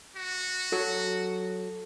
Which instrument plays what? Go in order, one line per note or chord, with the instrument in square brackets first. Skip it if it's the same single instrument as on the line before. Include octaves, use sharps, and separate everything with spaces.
[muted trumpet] F#4
[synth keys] F#3 [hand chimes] A4